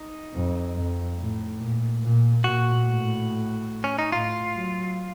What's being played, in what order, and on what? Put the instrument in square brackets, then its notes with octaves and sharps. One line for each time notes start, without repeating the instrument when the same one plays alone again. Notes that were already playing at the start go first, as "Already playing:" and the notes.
Already playing: [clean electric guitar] D#4
[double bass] F2
F2
A2
A#2
A#2
[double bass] A#2 [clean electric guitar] F#4
[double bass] A2
[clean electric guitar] C#4
D#4
[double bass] A2 [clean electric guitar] F4
[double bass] F#3